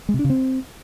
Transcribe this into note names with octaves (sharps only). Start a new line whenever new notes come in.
G#3
C3
D4
C#3
C4